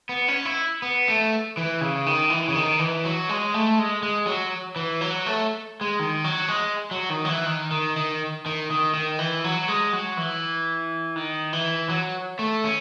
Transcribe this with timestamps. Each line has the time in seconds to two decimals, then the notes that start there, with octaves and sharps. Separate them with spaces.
0.09 B3
0.28 C#4
0.45 E4
0.82 B3
1.08 A3
1.57 E3
1.81 C#3
2.06 D#3
2.30 E3
2.49 C#3
2.55 D#3
2.79 E3
3.05 F#3
3.29 G#3
3.54 A3
3.79 G#3
4.03 G#3
4.27 F#3
4.76 E3
5.01 F#3
5.26 A3
5.81 G#3
6.00 D#3
6.24 F#3
6.48 G#3
6.91 F#3
7.10 D#3
7.25 F#3
7.29 E3
7.46 D#3
7.71 D#3
7.97 D#3
8.46 D#3
8.71 D#3
8.94 D#3
9.19 E3
9.44 F#3
9.68 G#3
9.93 F#3
10.17 E3
11.16 D#3
11.53 E3
11.89 F#3
12.39 A3
12.64 C#4